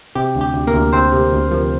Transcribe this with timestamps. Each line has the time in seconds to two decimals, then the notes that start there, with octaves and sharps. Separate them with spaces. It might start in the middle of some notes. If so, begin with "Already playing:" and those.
0.15 C3 G4
0.35 D2
0.41 G4
0.54 D2
0.67 A#3 A#4
0.73 D2
0.93 D2 C4 C5
1.12 C3
1.32 D2
1.51 F3